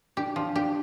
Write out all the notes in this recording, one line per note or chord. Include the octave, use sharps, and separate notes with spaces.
D4 G4
F3 D4
D4 G4